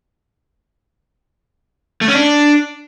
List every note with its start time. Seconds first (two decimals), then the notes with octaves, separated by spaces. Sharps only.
2.01 A3
2.08 C#4
2.15 D4